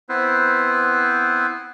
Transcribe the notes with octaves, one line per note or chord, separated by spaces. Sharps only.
B3 C4 E4 B4 C5